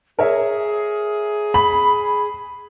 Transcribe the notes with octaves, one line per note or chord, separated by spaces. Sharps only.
G#4 A#4 C#5 E5
B5